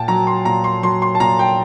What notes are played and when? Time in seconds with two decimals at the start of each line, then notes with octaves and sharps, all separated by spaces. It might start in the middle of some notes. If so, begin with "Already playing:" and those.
Already playing: A#2 G5 A5
0.08 F#3 A#5
0.27 C6
0.45 A#2 A#5
0.64 C6
0.83 F#3 C6
1.02 C6
1.15 A5
1.20 A#2 A#5
1.39 G5